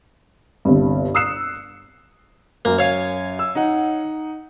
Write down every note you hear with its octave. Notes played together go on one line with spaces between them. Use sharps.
G1 C2 G2
D#6 E6 F#6 C7 C#7 E7
F#2 A#3
C#5 F5 G#5
E6
D#4 F#5